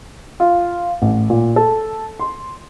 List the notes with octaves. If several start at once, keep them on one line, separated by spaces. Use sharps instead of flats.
F4
A1
A#2
A4
C6